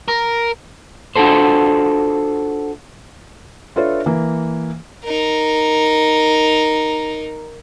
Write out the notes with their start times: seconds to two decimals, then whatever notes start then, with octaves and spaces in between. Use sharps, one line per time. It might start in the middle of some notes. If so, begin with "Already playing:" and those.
0.08 A#4
1.16 D4 F4 F#4 A4 C5
3.76 D4 F4 A4 B4 C#5 E5
4.06 E3 A#3
5.05 D#4 A#4